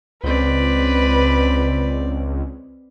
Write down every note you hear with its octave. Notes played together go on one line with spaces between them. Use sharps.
C#2 C4 B4 D5